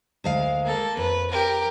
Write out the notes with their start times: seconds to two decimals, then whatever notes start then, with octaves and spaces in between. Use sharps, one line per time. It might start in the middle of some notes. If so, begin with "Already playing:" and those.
0.24 D2 G#3 F5
0.64 A#3 A4
0.97 F2 B4
1.31 G4 A#4